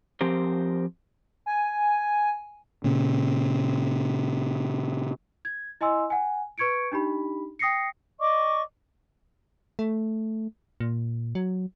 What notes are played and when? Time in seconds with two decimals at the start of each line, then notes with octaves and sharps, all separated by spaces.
0.21 F3 C4 G4 A#4 C5
1.46 G#5
2.84 A#2 C#3
5.45 G#6
5.81 E4 D#5 G#5 C6 E6
6.10 F#5 G#5
6.58 B4 C#6 G#6 C#7 D7
6.92 D4 D#4 G4 B5
7.59 G5 D#6 A#6 C7 C#7
8.20 D5 D#5 C#6 D6
9.79 A3
10.80 A#2
11.35 F#3